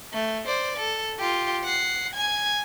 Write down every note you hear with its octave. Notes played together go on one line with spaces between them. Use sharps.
A3
C5 D5
A4
F4 G4
F#5 C7
G#5 G#6